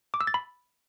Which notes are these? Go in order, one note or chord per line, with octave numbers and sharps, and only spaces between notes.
D6
E6
A6
B5